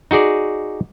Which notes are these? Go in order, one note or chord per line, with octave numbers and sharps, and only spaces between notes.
D#4 F#4 G#4 D5